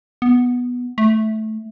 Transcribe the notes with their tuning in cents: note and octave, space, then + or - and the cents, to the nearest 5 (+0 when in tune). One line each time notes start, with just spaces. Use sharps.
B3 -5
A3 -10